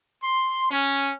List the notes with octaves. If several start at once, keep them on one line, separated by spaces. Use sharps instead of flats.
C6
C#4